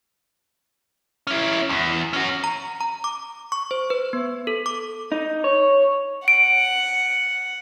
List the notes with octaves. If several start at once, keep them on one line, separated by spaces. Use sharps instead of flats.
C#4 E4
E2
C#4 F#4
A#5
A#5
D6
C#6
C5
B4
B3
A4
D6
D#4
C#5
F#5 D7